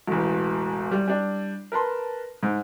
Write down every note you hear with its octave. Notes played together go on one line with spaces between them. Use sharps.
E1 A1
G3
G3 D4
A#4 B4 A5 C6
G#2